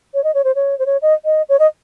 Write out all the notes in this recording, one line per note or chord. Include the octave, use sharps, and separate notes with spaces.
C#5
D#5
C#5
C5
C#5
C5
C#5
D#5
D#5
C#5
D#5